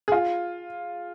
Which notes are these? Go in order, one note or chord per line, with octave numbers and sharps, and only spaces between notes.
G#4
F4